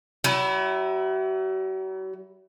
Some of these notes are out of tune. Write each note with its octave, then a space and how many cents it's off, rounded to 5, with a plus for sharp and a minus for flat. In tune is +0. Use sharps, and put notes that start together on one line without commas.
F#3 +40 E4 +0